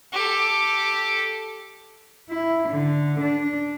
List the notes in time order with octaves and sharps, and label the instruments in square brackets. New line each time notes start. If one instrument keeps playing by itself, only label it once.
[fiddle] G4 A4
[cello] E4
D3
D4